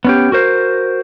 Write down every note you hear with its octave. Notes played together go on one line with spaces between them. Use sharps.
B3 C#4 G4
F#4 A#4 C5